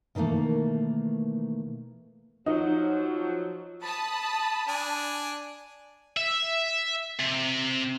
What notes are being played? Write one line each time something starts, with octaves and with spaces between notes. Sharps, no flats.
B2 D#3 E3 A3 A#3
F3 F#3 D#4
A5 B5 D#6
D4 G#5
E5
C3